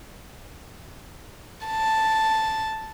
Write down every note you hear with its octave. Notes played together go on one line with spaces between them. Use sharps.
A5